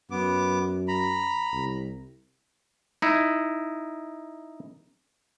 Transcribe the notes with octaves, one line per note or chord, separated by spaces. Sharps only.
F#2 B3 D6
A#5 B5
C2
D#4 E4